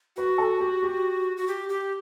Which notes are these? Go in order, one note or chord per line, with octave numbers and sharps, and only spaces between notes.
F#4 B4
A4
G4
G4
F#4
G4
G4